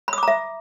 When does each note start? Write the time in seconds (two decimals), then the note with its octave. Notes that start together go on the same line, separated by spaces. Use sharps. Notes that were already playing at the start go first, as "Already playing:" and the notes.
0.08 B5
0.13 D#6
0.18 D6
0.23 A#5
0.28 E5